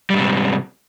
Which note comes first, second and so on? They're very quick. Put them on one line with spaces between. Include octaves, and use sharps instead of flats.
G3 G#2 C3